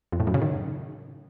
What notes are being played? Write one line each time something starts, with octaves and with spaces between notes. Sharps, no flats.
F2
A2
F#2
C#3
D#3